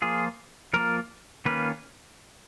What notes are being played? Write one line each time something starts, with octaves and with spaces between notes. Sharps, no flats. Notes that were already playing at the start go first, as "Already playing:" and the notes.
F3 A#3 F4 G#4
F3 A#3 F4 A#4
D#3 A#3 C#4 F4 B4